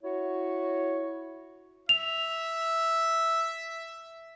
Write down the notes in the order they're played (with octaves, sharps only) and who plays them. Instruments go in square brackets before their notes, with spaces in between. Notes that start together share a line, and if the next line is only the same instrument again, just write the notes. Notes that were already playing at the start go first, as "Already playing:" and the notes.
[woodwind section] E4 F#4 C#5
[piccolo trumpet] E5 [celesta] F7